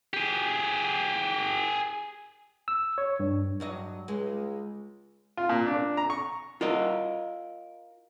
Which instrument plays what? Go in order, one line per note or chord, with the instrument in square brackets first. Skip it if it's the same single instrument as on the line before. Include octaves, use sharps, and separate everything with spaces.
[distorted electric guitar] G4 G#4
[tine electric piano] E6
C#5
G2
[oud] G2 F#3 D#5
[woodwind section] C#2 [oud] G#3
[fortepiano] F4
A#2
D4
A#5
C#6
[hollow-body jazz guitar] F4 A#4 D#5